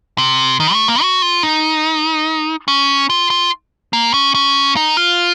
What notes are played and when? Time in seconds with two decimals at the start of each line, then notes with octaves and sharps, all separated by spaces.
0.18 C3
0.60 D#3
0.73 A3
0.88 A#3
1.02 F#4
1.22 F4
1.43 D#4
2.68 C#4
3.10 F4
3.30 F4
3.93 A#3
4.14 C#4
4.34 C#4
4.76 D#4
4.97 F4